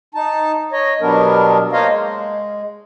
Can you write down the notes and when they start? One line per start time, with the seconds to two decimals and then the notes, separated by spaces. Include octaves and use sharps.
0.15 D#4 A5
0.72 C#5 D#5
1.01 B2 F#3 G3 B3 D4 A#4
1.72 A#3 D#4 C5 C#5 D#5 F5
1.88 G#3